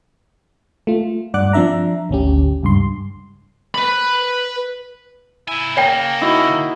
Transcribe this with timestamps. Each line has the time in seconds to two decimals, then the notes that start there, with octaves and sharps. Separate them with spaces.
0.87 A3 F4
1.34 G2 D5 F#5 D6 F#6
1.53 F3 C4 D4 E5 A#5
2.09 G#1 D2 C#4 G4
2.63 C#2 G2 C6
3.75 B4 B5
5.48 A#3 E4 G#5
5.77 C#3 A#3 C#5 G5
6.21 D#4 E4 F#4